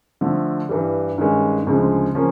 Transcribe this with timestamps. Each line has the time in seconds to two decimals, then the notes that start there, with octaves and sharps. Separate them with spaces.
0.21 D3 F3 A3
0.69 G2 E3 G3
1.18 G2 D#3 G#3 C#4
1.67 D2 C#3 F3 G#3
2.15 C#3 F3 A#3 C#4